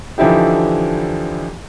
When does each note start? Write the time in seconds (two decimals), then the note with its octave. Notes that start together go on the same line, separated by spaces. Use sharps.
0.18 D3 E3 F3 D#4 E4 G4